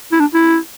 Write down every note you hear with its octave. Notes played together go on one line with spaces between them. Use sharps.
E4
D4
E4